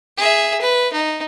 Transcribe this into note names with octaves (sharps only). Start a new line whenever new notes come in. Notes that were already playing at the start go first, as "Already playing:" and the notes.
G#4 E5
B4
D#4